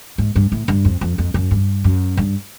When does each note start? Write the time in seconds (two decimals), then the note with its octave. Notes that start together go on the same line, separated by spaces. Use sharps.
0.18 G#2
0.36 G2
0.52 A2
0.68 G2
0.85 F2
1.01 F2
1.18 F2
1.34 F#2
1.51 G2
1.84 F#2
2.17 G2